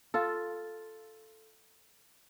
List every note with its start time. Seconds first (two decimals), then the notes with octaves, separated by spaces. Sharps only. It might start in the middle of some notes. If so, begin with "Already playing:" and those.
0.14 F4 A4